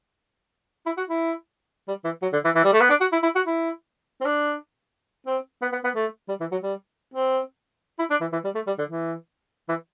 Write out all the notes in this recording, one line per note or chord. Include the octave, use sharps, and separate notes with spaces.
E4
F#4
E4
G3
E3
F#3
D3
E3
E3
G3
A3
B3
D4
F#4
E4
E4
F#4
E4
C4
D4
C4
B3
B3
B3
A3
G3
E3
F#3
G3
C4
E4
D4
E3
E3
G3
A3
G3
D3
E3
E3